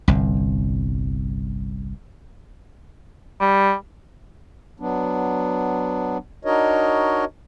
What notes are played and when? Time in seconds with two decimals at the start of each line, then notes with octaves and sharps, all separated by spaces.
0.08 G1 C2
3.40 G3
4.80 F#3 B3 D4
6.45 D4 D#4 F#4 A#4 C#5 D#5